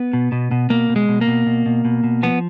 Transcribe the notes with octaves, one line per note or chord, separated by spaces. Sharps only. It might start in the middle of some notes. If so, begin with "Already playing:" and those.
Already playing: B3
B2
B2
B2
B2 A#3
B2
G#3
B2
A#3
B2
B2
B2
B2
B2
F3 B3